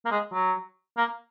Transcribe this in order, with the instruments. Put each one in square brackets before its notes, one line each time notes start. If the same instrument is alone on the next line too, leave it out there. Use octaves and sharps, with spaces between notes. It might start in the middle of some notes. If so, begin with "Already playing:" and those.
[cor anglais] A#3
G#3
F#3
A#3